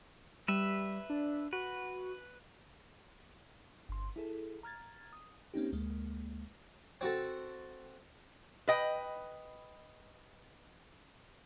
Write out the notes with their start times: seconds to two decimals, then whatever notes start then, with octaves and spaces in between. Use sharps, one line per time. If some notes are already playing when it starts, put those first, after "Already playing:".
0.48 G3 B4 E5
1.10 D4
1.53 F#4 B4
3.89 G1 C6
4.16 E4 G#4 A4
4.63 A#5 F6 G#6 A6
5.13 D#6
5.54 A#3 C4 C#4 D#4 G4
5.73 D2 G#3 A#3
7.01 C4 F#4 A4
8.68 B4 D#5 G5